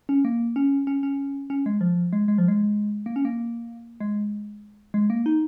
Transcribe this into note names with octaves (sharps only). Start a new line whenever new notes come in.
C#4
A#3
C#4
C#4
C#4
C#4
G#3
F3
G#3
G#3
F3
G#3
A#3
C#4
A#3
G#3
G#3
A#3
D#4